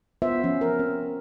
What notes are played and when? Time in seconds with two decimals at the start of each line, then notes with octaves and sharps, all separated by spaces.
0.22 B3 F4 C5 E5
0.44 F3 C#4
0.61 A#4
0.79 C4